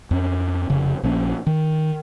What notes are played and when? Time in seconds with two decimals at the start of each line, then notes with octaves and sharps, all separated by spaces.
0.11 F2 C#4
0.70 F1 C#3
1.03 A#1 F3 A#3 C#4
1.47 D#3